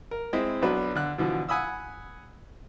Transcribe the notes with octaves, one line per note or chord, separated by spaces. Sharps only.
A#4
G#3 C4 E4 D#5 E5
B1 B2 F#3 D4 B4
D3 F#6
B2 D3 E3 F3
F#5 G#5 B5 D#6 E6